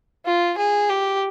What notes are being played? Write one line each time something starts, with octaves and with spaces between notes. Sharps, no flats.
F4
G#4
G4